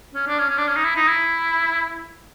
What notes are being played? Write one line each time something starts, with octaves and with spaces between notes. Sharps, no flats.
C#4
D4
C#4
C#4
D4
C#4
D#4
E4
D#4
E4